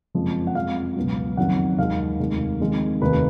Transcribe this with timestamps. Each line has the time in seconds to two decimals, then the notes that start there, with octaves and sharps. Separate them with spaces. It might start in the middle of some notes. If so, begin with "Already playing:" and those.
0.15 F#1 F2 F3 G#3
0.47 F#5
0.55 F2 F3 G#3 F5
0.96 C#2 B2 F#3
1.37 F#1 F2 D#3 F#3 F#5
1.78 D#2 D#3 G#3 F5
2.19 F1 D#2 D#3 G#3
2.60 F2 D#3 G#3
3.02 F1 D#2 D#3 B4